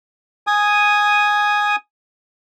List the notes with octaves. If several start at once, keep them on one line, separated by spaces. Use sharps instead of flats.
G#5 D#6